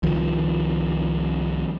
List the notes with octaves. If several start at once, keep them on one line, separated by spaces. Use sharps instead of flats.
C2 D#3 F3